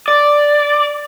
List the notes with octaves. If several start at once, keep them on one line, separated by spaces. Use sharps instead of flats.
D5